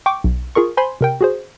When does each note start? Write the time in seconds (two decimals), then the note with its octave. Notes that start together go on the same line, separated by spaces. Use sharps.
0.06 G5 C#6 D6
0.24 B1
0.55 F4 G#4 A#4 C#6
0.77 C5 G#5 B5 C6
1.01 C3 A#4 G5
1.21 F#4 G#4 C5